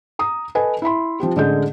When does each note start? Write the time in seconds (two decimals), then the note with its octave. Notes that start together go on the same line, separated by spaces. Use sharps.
0.19 A#5 D#6
0.55 A4 B4 D#5 G#5
0.82 E4 E5 B5 C6
1.20 F3 C4 G4
1.36 A1 D3 G#3 G#4 D#5 G6